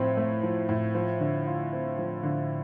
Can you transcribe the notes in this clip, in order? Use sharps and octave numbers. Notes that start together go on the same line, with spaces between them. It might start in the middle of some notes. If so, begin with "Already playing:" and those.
Already playing: A2 F3 C4
A3
F3
A2
F3
D3
F4
C4
F3
D3